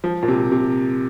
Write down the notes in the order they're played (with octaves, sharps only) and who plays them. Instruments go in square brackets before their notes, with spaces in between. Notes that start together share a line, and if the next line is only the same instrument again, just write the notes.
[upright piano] F3
A#2
C3
C3